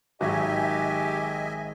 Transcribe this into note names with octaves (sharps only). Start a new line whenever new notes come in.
G#1 G#2 F#3 F#4 G4 D#5 E5 G#5